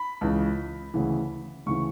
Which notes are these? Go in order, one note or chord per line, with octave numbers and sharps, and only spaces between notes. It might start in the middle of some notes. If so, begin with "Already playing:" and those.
Already playing: B5
C#2 C#3 E3
D2 C#3 E3
D2 C#3 E3 C#6